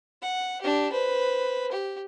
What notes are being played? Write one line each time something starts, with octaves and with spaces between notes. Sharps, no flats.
F#5
D4 G4
B4 C5
G4